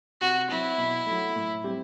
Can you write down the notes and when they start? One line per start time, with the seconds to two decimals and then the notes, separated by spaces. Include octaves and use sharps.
0.21 C3 F#4
0.49 F#3 C4 E4
0.78 B2
1.06 F#3 A3
1.36 A2
1.64 G3 C4 G4